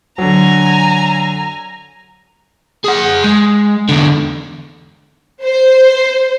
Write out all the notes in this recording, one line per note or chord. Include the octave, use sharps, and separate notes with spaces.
D3 F#3 G#5 A#5
G#4 F#5
G#3
E2 D3
C5